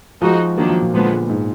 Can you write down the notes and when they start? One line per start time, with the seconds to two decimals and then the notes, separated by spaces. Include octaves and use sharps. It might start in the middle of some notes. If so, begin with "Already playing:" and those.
0.22 F3 G#3 D#4 F#4
0.57 D#3 F#3 A#3 D4
0.69 F3
0.81 A#2
0.94 A#2 D3 F3 G#3 B3
1.29 G#2